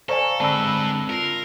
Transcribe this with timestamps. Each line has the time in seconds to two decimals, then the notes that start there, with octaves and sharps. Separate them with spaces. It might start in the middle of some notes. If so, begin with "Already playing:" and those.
0.09 A4 C5 D5 F5 G#5 A#5 C#6
0.40 D3 G#3 C4 D4 B4 A5 B5 E6
1.10 F4 A#4 C7